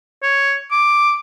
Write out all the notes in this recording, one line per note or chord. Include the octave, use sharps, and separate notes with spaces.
C#5
D6